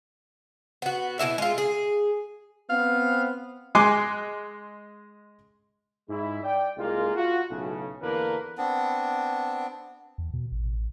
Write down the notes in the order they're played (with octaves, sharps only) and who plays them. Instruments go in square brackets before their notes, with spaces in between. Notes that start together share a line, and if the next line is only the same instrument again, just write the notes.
[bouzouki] B3 F#4
B2 F3 E4 E5
G#3 F4
G#4
[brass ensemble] B3 C4 [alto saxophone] F5
[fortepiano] G#3 G#5 C6 D6 F#6
[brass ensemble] G#2 G#3 E4
D5 G5
C2 G#3 A#3 F4
F4 F#4
B1 A2 C#3
E2 D3 A#3 A#4 B4
[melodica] B3 C4 D4
[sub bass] E2
B2
A1